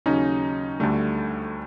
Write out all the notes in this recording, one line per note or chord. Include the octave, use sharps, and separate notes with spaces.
D#2 C#3 F#3 C#4 D#4
D2 D3 G3 A3